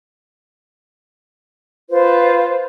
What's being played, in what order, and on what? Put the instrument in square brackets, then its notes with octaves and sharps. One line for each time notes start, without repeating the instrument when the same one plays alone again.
[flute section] F4 B4 C5